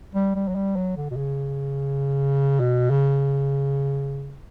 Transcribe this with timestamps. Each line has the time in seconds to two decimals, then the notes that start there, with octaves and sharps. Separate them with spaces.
0.15 G3
0.35 G3
0.48 F#3
0.55 G3
0.76 F#3
0.97 D3
1.11 B2
1.16 C#3
2.60 B2
2.90 C#3